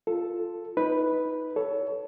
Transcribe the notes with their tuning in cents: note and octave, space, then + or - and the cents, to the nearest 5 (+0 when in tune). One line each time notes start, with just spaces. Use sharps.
F4 +0 A4 +0
D#4 +25 B4 +0
A4 +0 C#5 +25